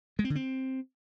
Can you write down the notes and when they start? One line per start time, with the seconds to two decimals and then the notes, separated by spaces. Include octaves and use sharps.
0.19 G#3
0.24 C4
0.30 D3
0.35 C4